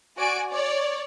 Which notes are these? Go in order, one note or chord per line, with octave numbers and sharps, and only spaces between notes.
F#4 D5 G#5 D7
C#5 D5